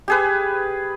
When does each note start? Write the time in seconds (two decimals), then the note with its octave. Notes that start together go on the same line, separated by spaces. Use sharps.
0.08 G4 G#4 B4